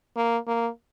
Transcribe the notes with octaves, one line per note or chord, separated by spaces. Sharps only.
A#3
A#3